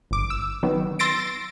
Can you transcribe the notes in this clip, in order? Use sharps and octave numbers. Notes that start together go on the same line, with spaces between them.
G1 D6
E6
D#3 F#3 B3
C6 E6 A6 A#6 C7 D7